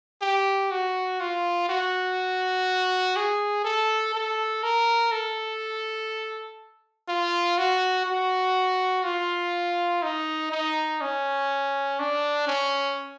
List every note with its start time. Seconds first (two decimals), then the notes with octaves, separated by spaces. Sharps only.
0.21 G4
0.71 F#4
1.20 F4
1.69 F#4
3.17 G#4
3.65 A4
4.15 A4
4.64 A#4
5.12 A4
7.08 F4
7.58 F#4
8.06 F#4
9.04 F4
10.03 D#4
10.52 D#4
11.01 C#4
12.00 D4
12.47 C#4